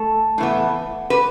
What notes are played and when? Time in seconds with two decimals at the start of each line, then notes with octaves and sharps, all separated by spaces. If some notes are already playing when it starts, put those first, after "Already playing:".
Already playing: A3 A4
0.38 A2 E3 B3
1.10 B4